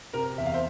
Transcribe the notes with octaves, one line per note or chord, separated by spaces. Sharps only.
C3 A#4
E2 E5
F5
C5 E5